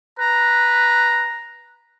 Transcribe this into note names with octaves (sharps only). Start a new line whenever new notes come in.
B4 A#5